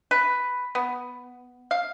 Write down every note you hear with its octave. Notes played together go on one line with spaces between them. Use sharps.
B4
B3
F5